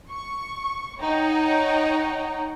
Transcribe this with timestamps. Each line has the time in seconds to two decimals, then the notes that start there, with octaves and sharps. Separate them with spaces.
0.11 C#6
1.00 D#4 C#5 F#5 G5 A#5